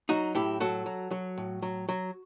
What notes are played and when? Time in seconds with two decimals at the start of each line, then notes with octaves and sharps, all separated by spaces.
0.09 F#3 D#4 F#4
0.35 A2 E4 G4
0.60 F#3 F#4 A4
0.86 F#3
1.11 F#3
1.38 A2
1.62 F#3
1.89 F#3